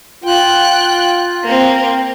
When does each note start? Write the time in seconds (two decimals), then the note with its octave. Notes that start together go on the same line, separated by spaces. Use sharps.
0.24 F4 G5 F#6
1.44 A#3 C4